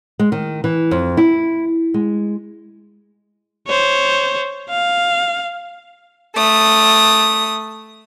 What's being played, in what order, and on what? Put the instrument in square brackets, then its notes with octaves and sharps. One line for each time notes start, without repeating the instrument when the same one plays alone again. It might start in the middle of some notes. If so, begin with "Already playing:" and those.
[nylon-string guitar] G#3
D#3
E3
F2
E4
G#3
[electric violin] C5 C#5
F5
[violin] A3 D#6